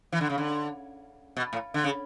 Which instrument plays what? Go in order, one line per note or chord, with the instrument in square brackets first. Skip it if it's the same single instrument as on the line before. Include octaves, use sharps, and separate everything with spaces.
[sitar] E3
D3
C#3
D3
B2
A2
D3
C#3